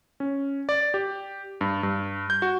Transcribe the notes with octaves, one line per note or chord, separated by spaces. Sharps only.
C#4
D5
G4
G2
G2
G6
F#4